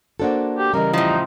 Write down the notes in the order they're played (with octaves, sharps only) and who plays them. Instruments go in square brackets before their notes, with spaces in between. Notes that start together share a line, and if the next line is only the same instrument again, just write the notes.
[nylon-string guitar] A#3 D4 A4 [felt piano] F#4 C5 F#5
[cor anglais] G4
[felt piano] C#3 D#5 [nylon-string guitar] E3 G3 [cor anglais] A#4
[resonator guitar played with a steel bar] A2 F3 [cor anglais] D#4